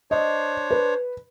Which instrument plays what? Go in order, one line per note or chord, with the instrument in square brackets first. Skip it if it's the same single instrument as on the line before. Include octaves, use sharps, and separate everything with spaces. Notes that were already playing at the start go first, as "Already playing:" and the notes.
[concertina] D4 C5 C#5 [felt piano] D#5
[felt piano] B4